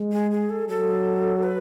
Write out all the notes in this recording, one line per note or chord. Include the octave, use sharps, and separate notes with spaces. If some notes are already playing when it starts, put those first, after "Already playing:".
Already playing: G#3
G#4
G#4
A4
F#3 A4
B4